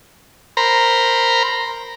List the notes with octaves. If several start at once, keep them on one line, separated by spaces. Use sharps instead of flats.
A#4 C5 A#5 B5